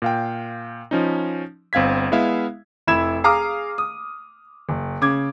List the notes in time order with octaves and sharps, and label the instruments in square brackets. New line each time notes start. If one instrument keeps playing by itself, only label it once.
[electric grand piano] A#2 F5 G5
F3 C#4 D#4
G1 C4 F5 G#6 B6
G#3 B3 E4 E5 F5
[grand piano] F1 E4 B5 E6 G#6 E7
G#4 F5 A#5 D6 D#6 F6
D#6
F#1
C#3 D6 G#6